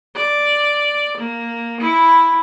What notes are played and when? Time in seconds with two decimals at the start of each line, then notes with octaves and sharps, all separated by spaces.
0.16 D5
1.18 A#3
1.81 E4